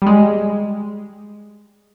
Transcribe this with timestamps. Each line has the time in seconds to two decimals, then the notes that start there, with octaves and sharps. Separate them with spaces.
0.02 G3
0.07 G#3